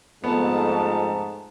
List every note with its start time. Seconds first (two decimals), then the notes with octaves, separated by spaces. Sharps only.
0.24 F2 G#2 A3 B3 A5